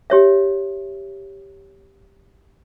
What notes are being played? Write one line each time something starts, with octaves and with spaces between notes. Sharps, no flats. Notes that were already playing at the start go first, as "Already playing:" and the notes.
G4 C#5 E5